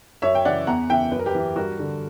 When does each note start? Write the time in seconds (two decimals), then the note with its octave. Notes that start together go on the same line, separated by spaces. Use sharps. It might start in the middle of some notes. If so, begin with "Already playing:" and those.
0.22 F#2 C#5 E5
0.35 G5
0.45 C#3 E3 D5 F#5
0.67 E2 F#5 A#5
0.89 C#3 E3 E5 G5
1.12 F#2 B4
1.19 A#4
1.26 G4 B4
1.35 E3
1.56 G2 F#4 A#4
1.79 D3